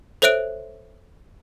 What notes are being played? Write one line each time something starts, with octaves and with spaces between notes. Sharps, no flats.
A4 C5 C#5 E5 F#6 D7